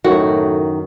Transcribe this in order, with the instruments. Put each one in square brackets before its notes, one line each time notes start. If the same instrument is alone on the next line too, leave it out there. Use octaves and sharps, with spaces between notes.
[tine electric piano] F#2 D#3 [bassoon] A2 [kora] F#4